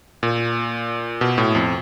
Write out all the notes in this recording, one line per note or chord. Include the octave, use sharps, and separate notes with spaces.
A#2
B2
A2
F2